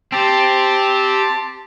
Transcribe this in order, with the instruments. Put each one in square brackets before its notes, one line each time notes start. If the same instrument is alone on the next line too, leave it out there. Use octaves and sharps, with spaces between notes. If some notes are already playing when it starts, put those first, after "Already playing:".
[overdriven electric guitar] C4 [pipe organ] G4 [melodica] A5